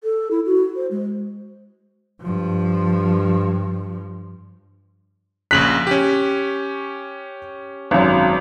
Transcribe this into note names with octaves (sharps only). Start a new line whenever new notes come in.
A4
E4
F#4
C5
G#3
G2 F3
A#1 C#3 F#6 B6 F#7
C#4 G4
G#1 F#2